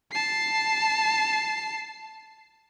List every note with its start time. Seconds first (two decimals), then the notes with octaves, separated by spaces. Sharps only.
0.12 A5 C7